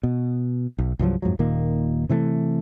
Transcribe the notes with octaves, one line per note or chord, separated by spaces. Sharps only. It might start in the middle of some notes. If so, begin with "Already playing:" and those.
B2
B1
C2 G2 F3 F#3
F2 G#2 F3 F#3
D#1 A#2 D#3 A#3
C3 E3 G3 A3